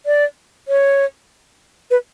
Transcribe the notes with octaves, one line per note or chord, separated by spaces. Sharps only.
D5
C#5
B4